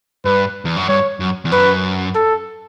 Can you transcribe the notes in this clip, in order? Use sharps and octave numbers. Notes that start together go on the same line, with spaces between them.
G2 B4
E2
F#2
G2 C#5
F#2
E2
F#2 B4
A4